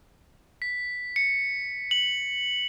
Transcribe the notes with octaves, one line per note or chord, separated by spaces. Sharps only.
B6
C#7
F#7